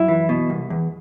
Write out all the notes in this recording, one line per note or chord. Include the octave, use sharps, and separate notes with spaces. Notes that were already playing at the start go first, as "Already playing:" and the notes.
Already playing: F#2 E4
E3
B2
C2
E2